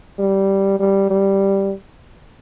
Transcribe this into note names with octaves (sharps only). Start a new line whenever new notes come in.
G3
G3
G3